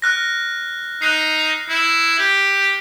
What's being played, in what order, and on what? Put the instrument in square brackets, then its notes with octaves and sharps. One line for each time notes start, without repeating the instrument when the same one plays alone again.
[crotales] F6 F#6 A#6
[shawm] D#4 [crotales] F#6 C7
[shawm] E4
G4